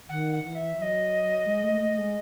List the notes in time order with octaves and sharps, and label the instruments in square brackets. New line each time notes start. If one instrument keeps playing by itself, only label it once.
[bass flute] D#3 [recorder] F#5
[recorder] F#5
[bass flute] E3
[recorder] E5
[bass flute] F#3 [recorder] E5
[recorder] D#5
[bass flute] G#3
A3
A3
G#3